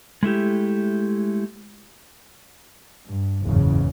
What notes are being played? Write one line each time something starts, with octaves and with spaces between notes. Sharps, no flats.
G#3 A3 E4 G4
G2
F#1 E2 G#2 C#3